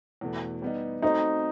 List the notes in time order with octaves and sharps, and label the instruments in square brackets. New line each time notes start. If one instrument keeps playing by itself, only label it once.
[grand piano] E2 B2 A3
G3 B3 D#4
[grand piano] A3 C4 F#4 C5 [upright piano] D#4